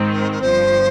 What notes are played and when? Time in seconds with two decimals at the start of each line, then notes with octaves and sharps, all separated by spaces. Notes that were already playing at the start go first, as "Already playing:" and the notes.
Already playing: G#2 D#3 G#3 C4
0.11 A#4
0.31 A#4
0.41 G1 G2 F3 C5